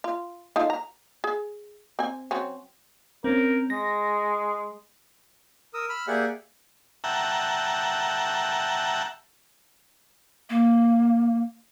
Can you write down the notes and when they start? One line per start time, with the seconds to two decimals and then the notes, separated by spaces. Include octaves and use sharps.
0.04 F4
0.56 D#4 F4 A4
0.70 A#5
1.24 G#4
1.99 C4 G#5
2.31 F#3 C4 C#4
3.24 C4 C#4 A#4
3.70 G#3 A#6
5.74 A#4 D#6 E6
5.89 B5 E6 F6
6.08 A#3 G4 G#4 D5 E5 F#5
7.04 E5 F#5 G5 A5 A#5
10.50 A#3